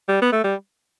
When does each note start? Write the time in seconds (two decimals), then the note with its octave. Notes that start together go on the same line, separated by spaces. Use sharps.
0.08 G3
0.22 B3
0.32 A3
0.44 G3